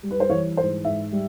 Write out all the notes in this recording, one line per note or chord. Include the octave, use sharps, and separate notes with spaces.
G3
B4
C5
E3 C#5
G#2 C5
G#2 E5
G3